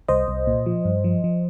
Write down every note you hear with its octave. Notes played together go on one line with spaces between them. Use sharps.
C2 C5 D#5
C2
A#2
F3
G2
F3
F3